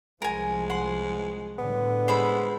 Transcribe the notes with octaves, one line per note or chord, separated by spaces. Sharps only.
C2 F3 G#3 A#4 G#5
F#5 C6
A2 D3 G3 B3
G#3 C5 B5 E6